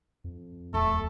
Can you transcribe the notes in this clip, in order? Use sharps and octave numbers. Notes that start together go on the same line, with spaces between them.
F2
D1 E2 A3 A4